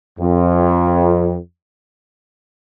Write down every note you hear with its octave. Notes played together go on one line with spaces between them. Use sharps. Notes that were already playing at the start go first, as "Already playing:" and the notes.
F2